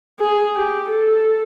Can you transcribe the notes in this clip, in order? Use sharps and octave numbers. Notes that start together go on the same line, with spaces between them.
G#4
G4
A4